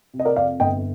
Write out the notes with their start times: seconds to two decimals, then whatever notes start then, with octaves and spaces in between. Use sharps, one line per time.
0.14 C3
0.19 D#5
0.25 A#4 D5
0.36 F2 D5 F5
0.60 G1 D#5 G5